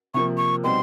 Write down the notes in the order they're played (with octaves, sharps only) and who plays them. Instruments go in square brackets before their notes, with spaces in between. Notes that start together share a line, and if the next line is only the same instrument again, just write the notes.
[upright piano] C3 F3 A#3 [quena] C#6
[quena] C#6
[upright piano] B2 G3 C4 D#4 [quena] C6